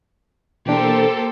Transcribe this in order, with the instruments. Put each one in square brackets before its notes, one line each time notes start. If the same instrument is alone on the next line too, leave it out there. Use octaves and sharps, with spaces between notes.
[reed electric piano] B2 E3 D4 [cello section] A#3 C5 [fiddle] G4 A#4 [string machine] A4